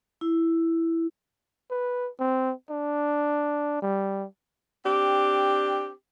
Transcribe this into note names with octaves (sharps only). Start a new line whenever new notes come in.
E4
B4
C4
D4
G3
C4 D4 G4